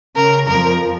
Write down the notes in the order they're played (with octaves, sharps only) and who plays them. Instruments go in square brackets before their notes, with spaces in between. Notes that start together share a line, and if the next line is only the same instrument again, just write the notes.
[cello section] C#3 [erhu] A#4
[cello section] F2 F3 [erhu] A#4